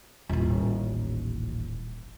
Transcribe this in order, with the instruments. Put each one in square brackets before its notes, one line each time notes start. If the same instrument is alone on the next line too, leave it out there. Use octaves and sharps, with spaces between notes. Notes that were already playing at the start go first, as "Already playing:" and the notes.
[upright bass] D#1 A1